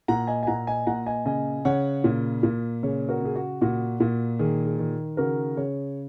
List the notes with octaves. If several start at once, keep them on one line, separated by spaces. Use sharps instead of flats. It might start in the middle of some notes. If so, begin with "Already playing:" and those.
A#2 F#5 A#5
D#5 G#5
G#5
A#2 F#5 A#5
D#5 G#5
A#2 F#5 A#5
D#5 G#5
C#3 D#5 G#5
C#3 C#5 F#5
A#2
A#2
C#3 G#4 C#5
F#4 A#4
C#3 G#4
F#4
A#2 F#4
A#2
D#3 G#4
G#4
D#3
C#3 F#4 A#4
C#3 G#4 C#5